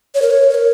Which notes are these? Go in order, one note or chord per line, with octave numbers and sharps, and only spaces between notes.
C#5
A#4
C#5
C#5
A#4